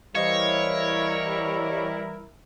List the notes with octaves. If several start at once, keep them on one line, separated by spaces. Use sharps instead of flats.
E3 G3 E4 A#4 C5 C#5 D#5 F5